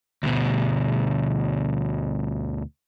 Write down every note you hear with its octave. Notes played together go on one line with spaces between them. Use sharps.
D2 B2